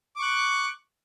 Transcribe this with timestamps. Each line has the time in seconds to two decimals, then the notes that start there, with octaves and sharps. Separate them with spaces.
0.16 D6
0.19 C#6
0.22 F#6